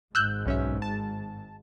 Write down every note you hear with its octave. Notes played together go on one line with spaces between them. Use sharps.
G#1 G#2 E6 F#6 G6
B1 C#4 E5
A5